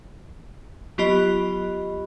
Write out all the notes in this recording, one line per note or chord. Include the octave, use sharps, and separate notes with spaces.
F#3 B3 F4 G4 D#5 B5